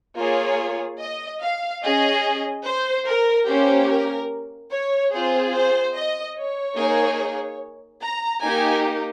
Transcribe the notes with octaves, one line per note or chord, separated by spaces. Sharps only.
A#3 F4 G#4 C#5
D#5
F5
C#4 G#4 D#5
C5
A#4
A#3 C#4 G4 C5
A#4
C#5
C4 F4 G#4 C5
C5
D#5
C#5
A#3 D#4 G#4
A#5
A#3 D#4 G4 G#5